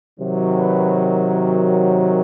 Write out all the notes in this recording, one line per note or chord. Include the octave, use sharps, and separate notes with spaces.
C3 D#3 F#3
B4
A#4